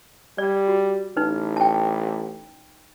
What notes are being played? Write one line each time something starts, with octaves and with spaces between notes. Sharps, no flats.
G3 D5
F#4
A1 D#4 B4
G5 A5